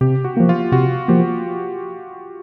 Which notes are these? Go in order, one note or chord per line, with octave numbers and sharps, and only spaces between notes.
C3 G4
F#4
F3 A#3
F4
C3 F#4
F3 A#3 G4